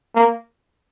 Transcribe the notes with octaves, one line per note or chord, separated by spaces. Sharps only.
A#3